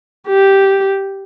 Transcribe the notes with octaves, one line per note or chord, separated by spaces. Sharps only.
G4